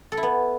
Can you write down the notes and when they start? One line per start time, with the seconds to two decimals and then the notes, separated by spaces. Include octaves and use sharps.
0.12 A4
0.17 E4
0.23 B3